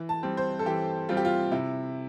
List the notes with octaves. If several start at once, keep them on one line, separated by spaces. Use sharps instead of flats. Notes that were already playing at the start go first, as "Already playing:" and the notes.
Already playing: E3
A5
G3 C4
C5
A4
E3 G4
G3 C4 F4
G4
F4
C3 E4